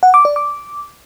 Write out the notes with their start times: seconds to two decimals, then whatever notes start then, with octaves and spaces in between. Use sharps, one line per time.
0.03 F#5
0.14 D6
0.25 D5
0.36 D6